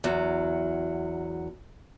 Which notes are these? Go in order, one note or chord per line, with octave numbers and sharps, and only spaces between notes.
E2 F#3